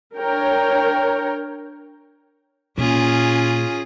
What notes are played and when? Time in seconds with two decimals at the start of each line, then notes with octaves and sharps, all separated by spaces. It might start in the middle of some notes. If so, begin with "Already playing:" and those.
0.14 D4 A#4 C#5 G5 A#5
2.78 A#2 C#4 F4 G#4